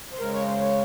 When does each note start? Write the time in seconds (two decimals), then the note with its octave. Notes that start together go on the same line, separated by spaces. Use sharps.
0.13 C5
0.20 C#3 G#3 A#4
0.33 C#5
0.47 C5
0.61 C#5